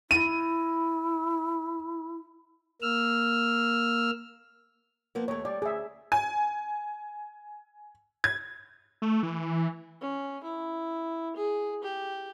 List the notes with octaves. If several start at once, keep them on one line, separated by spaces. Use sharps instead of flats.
E4 D#7
A#3 E6 F6
F3 A#3 B3
D#2 A3 C#5
G3 D5
D2 G#4 E5
G#5
G#6
A3
E3
C#4
E4
G#4
G4